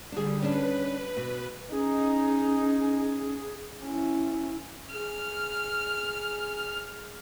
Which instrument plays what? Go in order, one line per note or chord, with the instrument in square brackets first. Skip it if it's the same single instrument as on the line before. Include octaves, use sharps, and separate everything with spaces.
[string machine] D3 G3 [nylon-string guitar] D4 G#4
[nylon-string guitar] C#4 D4 [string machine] B4
[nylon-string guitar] B2
[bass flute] C#4 [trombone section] D#4 [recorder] G#4
[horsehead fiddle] C#4 E4
[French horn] G#4 [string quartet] F6